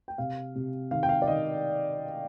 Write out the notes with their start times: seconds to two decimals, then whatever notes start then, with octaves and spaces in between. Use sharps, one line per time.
0.08 G5
0.18 C3 F5
0.55 C3
0.91 D#3 F5
1.03 G5
1.09 F5
1.22 D5
1.28 D#3 D#5